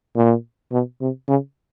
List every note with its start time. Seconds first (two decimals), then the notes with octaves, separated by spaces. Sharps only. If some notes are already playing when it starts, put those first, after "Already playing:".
0.16 A#2
0.72 B2
1.01 C3
1.28 C#3